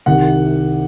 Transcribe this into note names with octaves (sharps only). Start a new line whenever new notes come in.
C2 C3 D#3 F#5